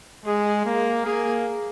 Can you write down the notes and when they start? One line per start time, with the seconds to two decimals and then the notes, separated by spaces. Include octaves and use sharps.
0.25 G#3 G#4
0.66 A#3
1.04 A#3 G#4